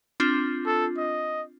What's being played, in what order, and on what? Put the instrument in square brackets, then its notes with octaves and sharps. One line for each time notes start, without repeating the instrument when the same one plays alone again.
[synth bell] C4 D4 F4
[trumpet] A4
D#5